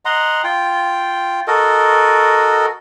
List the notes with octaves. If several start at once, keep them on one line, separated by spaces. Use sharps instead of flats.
D#5 F#5 A#5 C6
F4 G5
F#4 A4 A#4 D#5